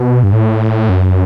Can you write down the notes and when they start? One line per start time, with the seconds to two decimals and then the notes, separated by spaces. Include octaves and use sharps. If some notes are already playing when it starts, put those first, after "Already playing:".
Already playing: B2
0.23 G2
0.33 A2
0.89 F#2